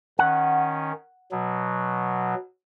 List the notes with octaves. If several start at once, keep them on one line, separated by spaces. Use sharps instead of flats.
D#3 C#4 F#5
B2 F#3